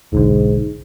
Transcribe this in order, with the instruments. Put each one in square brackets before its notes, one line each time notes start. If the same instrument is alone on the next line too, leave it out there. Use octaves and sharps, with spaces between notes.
[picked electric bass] E1 B1 D3 [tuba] G#2